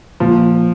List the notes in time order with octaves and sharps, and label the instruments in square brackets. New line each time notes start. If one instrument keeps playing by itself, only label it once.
[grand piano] A#2 [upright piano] F3